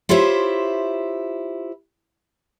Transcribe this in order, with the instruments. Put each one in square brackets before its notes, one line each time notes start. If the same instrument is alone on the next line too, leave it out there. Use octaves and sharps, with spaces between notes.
[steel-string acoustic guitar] E4 F4 G4 C5 C#5 E5